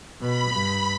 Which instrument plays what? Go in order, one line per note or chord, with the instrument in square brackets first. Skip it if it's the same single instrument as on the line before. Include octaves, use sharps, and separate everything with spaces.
[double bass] B2 [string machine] B5
[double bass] G2